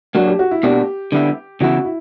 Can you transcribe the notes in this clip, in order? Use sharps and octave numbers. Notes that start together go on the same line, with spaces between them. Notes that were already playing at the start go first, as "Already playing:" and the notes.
F#3 A#3 D4 F#4
G4
F#4
E4
B2 A#3 D4 F#4 G4
D3 G3 B3 E4
C#3 E3 B3 E4 F#4
E4